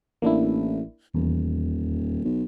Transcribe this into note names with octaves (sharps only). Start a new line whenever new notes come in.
A1 A#3 D4 E4
D#1 E2
B1